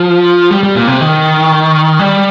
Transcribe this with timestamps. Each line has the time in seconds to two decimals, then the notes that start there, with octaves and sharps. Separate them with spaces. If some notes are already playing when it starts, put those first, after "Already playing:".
Already playing: F3
0.51 G3
0.63 G3
0.75 A#2
0.87 C3
1.01 D#3
1.99 G3